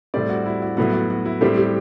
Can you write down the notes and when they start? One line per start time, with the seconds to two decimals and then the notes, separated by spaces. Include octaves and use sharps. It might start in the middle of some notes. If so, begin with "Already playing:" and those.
0.14 A2 G3 C4 D5
0.29 F#4
0.46 E4
0.62 F#4
0.77 A2 F#3 B3 F#4
0.93 F#4
1.10 F#4
1.26 E4
1.41 A2 G3 C4 G4
1.57 G4